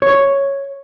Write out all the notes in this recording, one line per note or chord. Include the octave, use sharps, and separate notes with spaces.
C#5